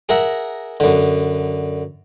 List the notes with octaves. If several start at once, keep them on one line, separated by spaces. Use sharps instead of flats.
G#4 A#4 E5 F#5
F#2 D3